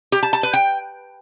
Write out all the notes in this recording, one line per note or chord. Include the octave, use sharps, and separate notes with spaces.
G4
A5
A5
B4
G5